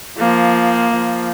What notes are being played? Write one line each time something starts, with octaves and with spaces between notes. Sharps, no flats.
F3 A#3
F3